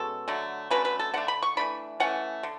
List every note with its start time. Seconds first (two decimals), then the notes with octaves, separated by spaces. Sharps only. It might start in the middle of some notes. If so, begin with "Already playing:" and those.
Already playing: B2 G#3 C#4 A4
0.28 D3 F#3 A3
0.70 D3 F#3 A3 C#4 B4
0.85 B4
0.99 A4
1.14 D3 A3 D4 F#5
1.28 B5
1.43 C#6
1.57 E3 A3 D4 B5
2.00 E3 A3 C#4 F#5
2.43 D3